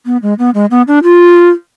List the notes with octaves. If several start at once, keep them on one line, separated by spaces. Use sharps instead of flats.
B3
G#3
B3
G#3
B3
D4
F4